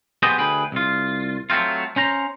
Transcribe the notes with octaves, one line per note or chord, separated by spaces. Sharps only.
B3 G4 G#4 C5 D#5
D2 G#4 B4 G5
C2 F4
F#3 A3 C4 F4
C#4 C5 A#5